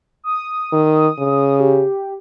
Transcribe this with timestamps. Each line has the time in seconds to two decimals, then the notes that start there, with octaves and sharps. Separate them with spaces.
0.24 D#6
0.72 D#3
1.18 C#3
1.60 G4